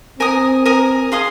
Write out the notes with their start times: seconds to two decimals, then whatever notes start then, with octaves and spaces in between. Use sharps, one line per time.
0.19 C4 A#4 G#5 D#6
0.66 A#4 G#5 D#6
1.12 G#4 F5 C6 D#6